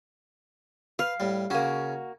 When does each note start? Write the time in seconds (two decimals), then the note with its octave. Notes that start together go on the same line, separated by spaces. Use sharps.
0.99 B4 F5
1.20 A2 G3
1.50 C#3 A#3 C#4 F#4